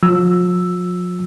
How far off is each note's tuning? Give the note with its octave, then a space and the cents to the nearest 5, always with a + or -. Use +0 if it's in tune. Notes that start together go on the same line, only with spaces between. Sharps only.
F3 +40 E6 +0